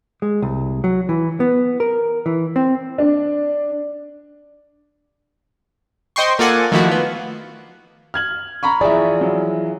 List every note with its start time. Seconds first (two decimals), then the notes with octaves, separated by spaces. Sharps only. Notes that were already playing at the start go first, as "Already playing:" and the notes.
0.22 G#3
0.42 C2
0.84 F#3
1.09 E3
1.40 B3
1.80 A#4
2.26 E3
2.56 C4
2.98 D4
6.16 C5 D#5 G5 C6 C#6
6.39 A#3 F4 A4 D5 F#5 G#5
6.72 D#3 F3 A3 A#3 E4 F#4
6.88 B3 F4
8.14 F6 G#6 F#7
8.63 A#5 B5 C#6
8.81 E3 F3 G#4 D5 E5
9.21 F#3